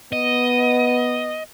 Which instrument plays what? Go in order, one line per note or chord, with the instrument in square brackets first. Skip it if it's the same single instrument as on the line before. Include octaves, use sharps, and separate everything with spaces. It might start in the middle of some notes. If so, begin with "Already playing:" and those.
[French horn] B3 [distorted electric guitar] D#5